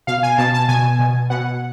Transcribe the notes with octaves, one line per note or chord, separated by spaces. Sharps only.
B2 F5
G#5
B2 A5
A5
B2 G#5
B2
B2 F#5